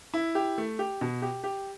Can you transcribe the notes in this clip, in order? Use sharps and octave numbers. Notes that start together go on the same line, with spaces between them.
E4
G4
A3
G4
B2
G4
G4